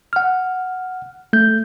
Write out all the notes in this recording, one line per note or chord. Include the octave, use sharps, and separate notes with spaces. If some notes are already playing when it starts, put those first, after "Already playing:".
F#5 F6
A3 G6